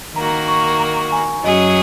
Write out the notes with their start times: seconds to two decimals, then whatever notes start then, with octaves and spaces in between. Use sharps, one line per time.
0.15 D#3 A#3 F#4 A#5
0.48 C#6
0.80 A#5
1.12 G#5
1.44 F#2 F#3 C#4 G#4 D#5